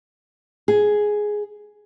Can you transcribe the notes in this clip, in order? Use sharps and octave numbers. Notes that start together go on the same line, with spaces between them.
G#4